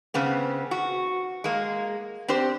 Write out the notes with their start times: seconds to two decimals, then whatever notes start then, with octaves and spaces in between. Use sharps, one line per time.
0.14 C#3 B3 C4
0.71 F#4
1.44 G#3 A#3
2.28 C4 D4 G4 C5